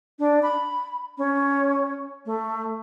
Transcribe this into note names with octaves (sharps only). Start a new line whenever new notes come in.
D4
B5
C#4
A3